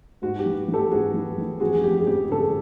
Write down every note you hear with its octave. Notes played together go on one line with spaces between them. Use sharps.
G#2 F#4
G4
E3
E3
G4 A4
G#2 F#4 G#4
E3
E3
F2 F#4 G#4
G#4
F3 G4
G#4
F2 G4
D3 A4
G#4